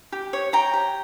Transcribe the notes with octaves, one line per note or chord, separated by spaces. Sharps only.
G4
C#5
C#5 G5 A#5
G4